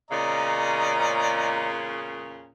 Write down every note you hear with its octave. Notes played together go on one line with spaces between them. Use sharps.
E2 A#2 C#3 D5 D#5 A#5